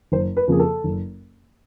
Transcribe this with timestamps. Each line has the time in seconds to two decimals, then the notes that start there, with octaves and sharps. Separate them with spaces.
0.12 F#1 C5
0.37 B4
0.48 F2 C#3 F3 A#3 G#4
0.60 A4
0.84 F#1